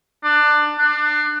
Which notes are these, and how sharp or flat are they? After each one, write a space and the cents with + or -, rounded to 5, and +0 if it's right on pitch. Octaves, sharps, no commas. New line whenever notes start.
D4 +20
D4 +30